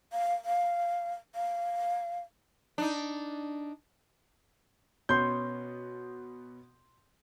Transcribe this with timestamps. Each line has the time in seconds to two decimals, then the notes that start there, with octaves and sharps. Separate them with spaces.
0.13 F5
0.45 F5
1.35 F5
2.78 D4 D#4
5.09 B2 B3 C#4 C6 G6